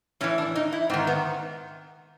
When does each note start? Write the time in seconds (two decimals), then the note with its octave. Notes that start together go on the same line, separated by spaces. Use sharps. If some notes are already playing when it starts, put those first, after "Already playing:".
0.21 A2 E3 C#4
0.38 D4
0.55 D#4
0.72 E4
0.90 G#2 C4
0.94 D#3
1.07 B3